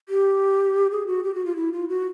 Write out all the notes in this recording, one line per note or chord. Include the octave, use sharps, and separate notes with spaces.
G4
G#4
F#4
G4
F#4
F4
E4
F4
F#4